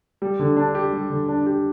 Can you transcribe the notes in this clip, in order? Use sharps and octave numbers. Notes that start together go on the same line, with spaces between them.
G3
D3
D4
G4
G3
D3
D4
G4